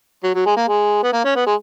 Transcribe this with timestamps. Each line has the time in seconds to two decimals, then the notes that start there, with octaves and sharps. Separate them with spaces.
0.23 F#3
0.34 F#3
0.46 G#3
0.56 A#3
0.67 G#3
1.03 B3
1.13 A#3
1.24 C#4
1.35 B3
1.46 G#3